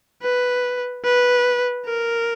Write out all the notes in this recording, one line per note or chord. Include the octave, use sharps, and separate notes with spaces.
B4
B4
A#4